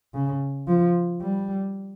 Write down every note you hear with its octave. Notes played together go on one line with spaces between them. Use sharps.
C#3
F3
G3